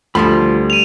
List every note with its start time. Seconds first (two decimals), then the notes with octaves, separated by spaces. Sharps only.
0.15 D2 F3 G3 A3 B5
0.70 D#7 F7